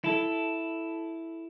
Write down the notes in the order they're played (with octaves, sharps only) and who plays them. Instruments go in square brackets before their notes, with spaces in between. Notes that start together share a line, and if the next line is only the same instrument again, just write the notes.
[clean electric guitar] E4 A4